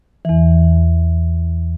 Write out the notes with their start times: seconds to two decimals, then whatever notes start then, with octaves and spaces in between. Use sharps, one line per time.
0.25 E2 E3